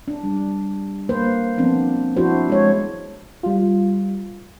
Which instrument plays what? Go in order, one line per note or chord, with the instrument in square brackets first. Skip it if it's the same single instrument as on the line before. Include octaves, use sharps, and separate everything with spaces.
[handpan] D4
G3
A#3 B4 C5
F3 B3 C4 D4
F3 D4 E4 F#4 C5
G#3 C#5
[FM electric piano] G3 F4